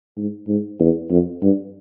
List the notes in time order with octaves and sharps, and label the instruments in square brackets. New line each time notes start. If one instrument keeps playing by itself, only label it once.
[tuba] G#2
G#2
E2
F2
G2